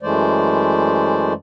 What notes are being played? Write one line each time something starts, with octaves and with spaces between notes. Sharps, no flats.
F#2 E3 G#3 A3 C5 D5